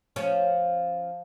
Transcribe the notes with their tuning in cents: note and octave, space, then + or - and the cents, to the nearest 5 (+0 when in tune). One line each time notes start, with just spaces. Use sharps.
F3 +0 C#4 +0